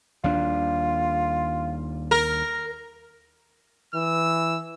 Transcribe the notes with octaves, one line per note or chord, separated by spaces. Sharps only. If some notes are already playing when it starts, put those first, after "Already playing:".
D#2 G3 D4 F4
A#4
E3 E6